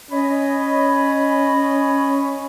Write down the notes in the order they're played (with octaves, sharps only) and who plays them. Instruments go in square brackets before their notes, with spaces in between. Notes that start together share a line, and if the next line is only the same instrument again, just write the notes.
[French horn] C#4 [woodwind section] C#5 D#5 B5